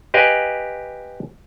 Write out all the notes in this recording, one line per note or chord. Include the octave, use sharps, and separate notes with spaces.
G4 B4 D#5 F5 G#5